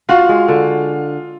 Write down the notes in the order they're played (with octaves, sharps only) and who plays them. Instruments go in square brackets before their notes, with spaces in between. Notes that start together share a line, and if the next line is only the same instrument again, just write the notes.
[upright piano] F4 F5 [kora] F#4
[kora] G#3
D3